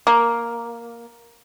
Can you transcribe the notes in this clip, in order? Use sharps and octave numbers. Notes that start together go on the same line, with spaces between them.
A#3